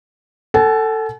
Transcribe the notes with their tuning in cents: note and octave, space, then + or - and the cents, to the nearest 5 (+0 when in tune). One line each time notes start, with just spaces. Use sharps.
A4 +15 F#5 +40 A5 -45